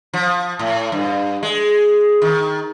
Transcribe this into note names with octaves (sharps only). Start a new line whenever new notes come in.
F3
A2
G2
G#3
D#3